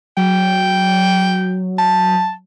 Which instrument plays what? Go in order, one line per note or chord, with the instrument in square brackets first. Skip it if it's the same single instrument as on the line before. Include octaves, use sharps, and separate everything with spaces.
[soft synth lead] F#3 [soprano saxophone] G5
[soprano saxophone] A5